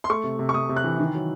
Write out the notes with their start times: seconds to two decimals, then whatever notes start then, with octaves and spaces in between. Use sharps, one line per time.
0.04 C6
0.10 A3 C#6
0.24 C3
0.39 C3
0.49 C#6
0.54 C3 D#6
0.69 C3
0.76 F#6
0.84 E3
0.99 D#3
1.15 F#3